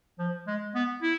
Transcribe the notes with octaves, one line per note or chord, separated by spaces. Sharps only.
F3
G#3
B3
E4